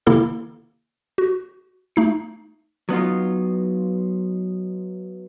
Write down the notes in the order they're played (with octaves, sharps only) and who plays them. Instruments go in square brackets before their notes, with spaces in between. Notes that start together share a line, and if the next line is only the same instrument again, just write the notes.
[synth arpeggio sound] C3 D#3 A#3 E4 A4 E6
F#4
A3 D#4 C7
[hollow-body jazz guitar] F#3 B3 D#4 F4